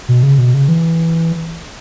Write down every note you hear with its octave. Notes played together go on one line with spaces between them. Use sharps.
B2
C#3
B2
C#3
E3